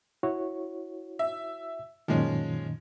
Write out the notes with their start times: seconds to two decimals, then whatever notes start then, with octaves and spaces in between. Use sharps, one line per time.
0.23 E4 F#4 C#5
1.19 E5
2.08 F#2 A#2 D#3 F3 G#3 C#4